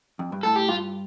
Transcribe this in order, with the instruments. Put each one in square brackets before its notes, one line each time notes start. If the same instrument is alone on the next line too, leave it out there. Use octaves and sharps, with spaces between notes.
[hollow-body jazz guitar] F2
G2
[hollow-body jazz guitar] A2 [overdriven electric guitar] A4
[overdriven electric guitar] G4
[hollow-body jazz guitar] G2 [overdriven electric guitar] F4